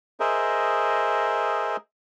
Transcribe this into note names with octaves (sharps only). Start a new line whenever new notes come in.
G#4 A#4 C5 D#5 E5